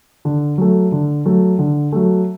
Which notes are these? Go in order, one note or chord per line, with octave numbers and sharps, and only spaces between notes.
D3
F#3 A3
D3
F#3 A3
D3
F#3 A3